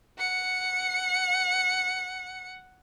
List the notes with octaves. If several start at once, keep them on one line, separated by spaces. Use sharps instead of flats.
F#5 C#7